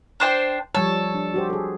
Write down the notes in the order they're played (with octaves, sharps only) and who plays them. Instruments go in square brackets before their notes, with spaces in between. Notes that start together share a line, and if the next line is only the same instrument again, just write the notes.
[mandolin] D4 C5 G5
[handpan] F3 G3 C#5 [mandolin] A4
[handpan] D4
F#4 G4 C5
G#4 A4